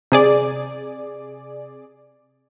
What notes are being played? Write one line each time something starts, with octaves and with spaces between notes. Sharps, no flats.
C3 G#4 D5